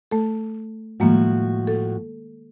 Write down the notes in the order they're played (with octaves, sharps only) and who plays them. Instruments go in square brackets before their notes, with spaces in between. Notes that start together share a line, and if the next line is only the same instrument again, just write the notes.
[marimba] A3 A4
[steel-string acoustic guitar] A2 F3 F#4 [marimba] D#3 G#3 A#3
[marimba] A4